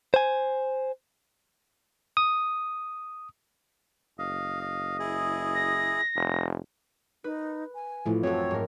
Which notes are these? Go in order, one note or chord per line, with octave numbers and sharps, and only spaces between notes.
C5 G#5
D#6
F#1 D#5 F5
D#5
E4 G#4
A#6
F1
D#4 B4
G#5
A1 A2 F3 A3
F#2 C4 F#4 A4 C#5
G#2 A#4